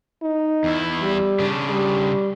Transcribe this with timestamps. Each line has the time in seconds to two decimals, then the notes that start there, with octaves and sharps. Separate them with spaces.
0.22 D#4
0.64 E2 E4
1.01 G3
1.40 C#3 D4
1.70 G3